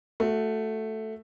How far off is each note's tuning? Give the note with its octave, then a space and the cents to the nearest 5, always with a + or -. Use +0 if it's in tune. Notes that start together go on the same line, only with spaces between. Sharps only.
A3 +0 F#4 -15